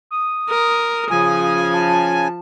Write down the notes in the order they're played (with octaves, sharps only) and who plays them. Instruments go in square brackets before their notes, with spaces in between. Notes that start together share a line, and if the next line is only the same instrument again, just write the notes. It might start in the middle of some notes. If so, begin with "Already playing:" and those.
[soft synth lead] D#6
[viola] A#4
[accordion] C#3 G#5 [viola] F3
[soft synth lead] A5